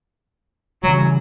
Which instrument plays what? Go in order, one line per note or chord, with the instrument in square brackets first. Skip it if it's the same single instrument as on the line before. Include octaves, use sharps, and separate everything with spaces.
[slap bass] C#3 E3 G3 [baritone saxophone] F#3